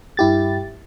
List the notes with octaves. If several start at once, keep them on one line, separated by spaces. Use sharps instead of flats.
G2 E4 G4 A6